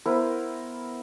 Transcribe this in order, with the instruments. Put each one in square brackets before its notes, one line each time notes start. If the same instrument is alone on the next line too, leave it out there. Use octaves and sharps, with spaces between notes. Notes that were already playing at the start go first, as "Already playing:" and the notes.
[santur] B3 E4 A#4 C5